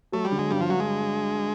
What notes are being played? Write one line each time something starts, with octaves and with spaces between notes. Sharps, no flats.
F#3 A3
G3
D3
G#3
G2 G3
F3
G2 F#3
G#3